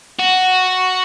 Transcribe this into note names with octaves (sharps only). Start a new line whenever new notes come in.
F#4